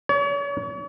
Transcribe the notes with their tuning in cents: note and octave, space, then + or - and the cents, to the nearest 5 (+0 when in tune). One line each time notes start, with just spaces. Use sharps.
C#5 +40